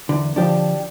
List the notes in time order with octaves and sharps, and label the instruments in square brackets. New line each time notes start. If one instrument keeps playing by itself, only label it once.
[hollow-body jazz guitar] E2 D3
[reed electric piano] D3 F3 [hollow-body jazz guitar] D4 G4